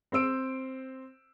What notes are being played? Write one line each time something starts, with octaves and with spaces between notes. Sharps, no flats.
C4 C5 E6 D7